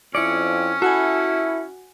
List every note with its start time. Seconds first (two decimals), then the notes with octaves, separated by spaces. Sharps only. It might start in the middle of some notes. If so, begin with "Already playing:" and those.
0.15 F2 C#4 E4 D5 C#7 D7
0.82 E4 F#4 A4 F#5 G#5